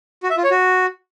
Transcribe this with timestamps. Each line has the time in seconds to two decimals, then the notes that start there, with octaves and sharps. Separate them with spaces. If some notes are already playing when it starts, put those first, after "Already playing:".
0.23 F#4
0.30 E5
0.37 F4
0.44 C#5
0.51 F#4